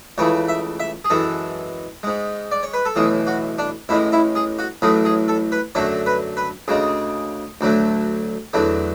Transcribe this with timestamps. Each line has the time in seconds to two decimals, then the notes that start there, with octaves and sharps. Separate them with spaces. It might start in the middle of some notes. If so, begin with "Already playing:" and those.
0.18 C#2 C#3 E3 A3 C#5
0.48 E5
0.80 E5
1.05 G#4
1.10 F#2 E3 G#3 A4
2.03 G#2 G#3
2.51 D5
2.63 C#5
2.74 B4
2.85 A4
2.96 B1 A2 E3 G#4
3.27 F#4
3.58 D4
3.89 A1 A2 G#3 E4
4.12 E4
4.36 G#4
4.59 F#4
4.82 A1 A2 F#3 A3 G#4
5.05 G#4
5.28 A4
5.52 B4
5.75 F#2 D3 F#3 A3 C#5
6.06 B4
6.37 B4
6.68 D2 C#3 G#3 G#4
7.61 D2 D3 F#3 A3
8.53 E2 D3 F#3 A3